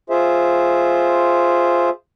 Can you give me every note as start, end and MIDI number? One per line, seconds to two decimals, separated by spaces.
0.10 1.89 65
0.10 1.89 68
0.10 1.89 72
0.10 1.89 76